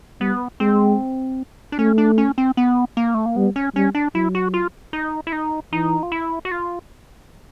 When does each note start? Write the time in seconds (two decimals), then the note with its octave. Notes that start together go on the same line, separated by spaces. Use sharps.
0.21 G3 B3
0.60 G#3 C4
1.72 D4
1.79 A3 C#4
1.98 D4
2.18 C#4
2.38 C4
2.57 B3
2.97 A#3
3.14 A3
3.26 A#3
3.36 G3 B3
3.56 C#4
3.75 G3 C#4
3.95 D4
4.15 F#3 E4
4.35 F#4
4.54 F4
4.93 D#4
5.27 E4
5.32 D#4
5.72 E3 D#4
6.03 F4
6.12 E4
6.45 F#4
6.51 F4